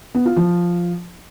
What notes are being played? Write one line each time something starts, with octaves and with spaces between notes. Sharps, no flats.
B3
F4
F3